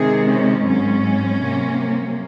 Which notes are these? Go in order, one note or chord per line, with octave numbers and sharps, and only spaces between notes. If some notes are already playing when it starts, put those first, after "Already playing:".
Already playing: C3 D#3 G#3 C4 G#4
C#4
G#2 F#3 C4 C#4
C3 F#3 A#3